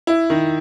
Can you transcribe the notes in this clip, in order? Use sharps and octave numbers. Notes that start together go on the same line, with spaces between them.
E4
D#3